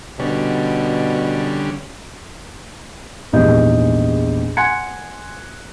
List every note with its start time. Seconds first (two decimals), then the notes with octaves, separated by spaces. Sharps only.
0.20 B2 D3 G3 C#4
3.33 A#1 E2 G#2 G4 D#5 G6
4.57 F#5 G#5 C6 F#6 G#6 C#7